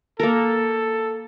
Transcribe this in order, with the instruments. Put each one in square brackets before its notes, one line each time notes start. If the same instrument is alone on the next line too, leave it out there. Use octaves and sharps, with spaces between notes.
[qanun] A#3 A#4 [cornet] A4